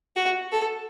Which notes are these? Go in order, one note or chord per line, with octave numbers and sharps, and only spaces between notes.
F#4
A4